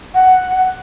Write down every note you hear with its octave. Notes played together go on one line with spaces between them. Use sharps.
F#5